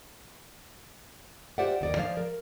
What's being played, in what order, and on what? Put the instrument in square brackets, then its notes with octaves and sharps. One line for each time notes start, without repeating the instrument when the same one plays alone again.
[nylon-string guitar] F4 G4 C5 D5 E5 F#5
D#2 D5 D#5
F3 G#3 C5 D5 F5
A#4